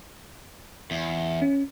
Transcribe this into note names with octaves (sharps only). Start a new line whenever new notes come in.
E2
C#4